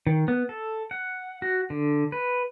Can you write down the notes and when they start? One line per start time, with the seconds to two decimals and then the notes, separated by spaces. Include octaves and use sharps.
0.07 D#3
0.28 B3
0.49 A4
0.91 F#5
1.42 F#4
1.70 D3
2.12 B4